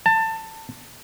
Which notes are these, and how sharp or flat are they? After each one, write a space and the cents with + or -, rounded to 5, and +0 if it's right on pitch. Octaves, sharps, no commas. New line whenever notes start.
A5 +20